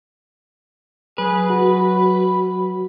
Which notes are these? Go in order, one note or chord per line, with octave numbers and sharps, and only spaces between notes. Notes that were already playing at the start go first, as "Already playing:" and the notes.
F#3 G#4 B4
F#4 B5